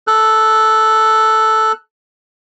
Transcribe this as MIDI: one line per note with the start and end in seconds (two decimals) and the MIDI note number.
0.07 1.72 69
0.07 1.72 90